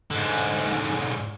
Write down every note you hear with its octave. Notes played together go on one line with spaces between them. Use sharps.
G#2 D3